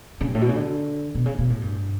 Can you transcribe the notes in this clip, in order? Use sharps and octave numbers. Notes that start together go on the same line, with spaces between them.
C#3
G2
A2
B2
C#3
D3
B2
C#3
B2
A2
G2